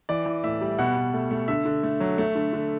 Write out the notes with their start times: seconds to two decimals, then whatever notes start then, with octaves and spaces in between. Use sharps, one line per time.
0.09 E3 D5
0.26 E3
0.44 A2 E5
0.61 G3
0.78 B2 F#5
0.96 B2
1.14 A3
1.31 A3
1.48 D3 E5
1.66 D3
1.83 A3
2.00 F#3
2.18 A3
2.35 D3
2.53 D3